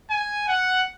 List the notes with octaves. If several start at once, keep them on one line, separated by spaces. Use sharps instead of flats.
G#5
F#5